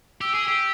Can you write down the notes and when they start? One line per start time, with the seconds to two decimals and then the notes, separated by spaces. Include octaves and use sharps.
0.21 G4 E6
0.34 G#4
0.48 G4